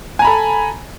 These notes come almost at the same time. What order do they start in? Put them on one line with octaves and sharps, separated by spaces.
G#5 A#5 B5 A4